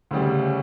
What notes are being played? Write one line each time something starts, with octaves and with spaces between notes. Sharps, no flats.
D2 C#3 G3